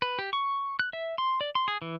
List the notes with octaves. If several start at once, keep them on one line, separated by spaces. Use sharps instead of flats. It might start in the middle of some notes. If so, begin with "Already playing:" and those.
B4
G4
C#6
F#6
E5
C6
D5
C6
G#4
E3